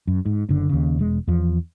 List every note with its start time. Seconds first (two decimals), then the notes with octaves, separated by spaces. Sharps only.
0.07 F#2
0.25 G#2
0.49 F#1 D3
0.69 D#2 C#3
0.99 E1 G#3
1.27 E2 F3